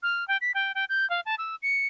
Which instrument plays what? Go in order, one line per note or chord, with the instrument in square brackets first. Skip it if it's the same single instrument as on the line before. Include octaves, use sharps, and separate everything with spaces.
[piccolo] F6
G5
B6
G5
G5
G6
F5
A5
E6
C#7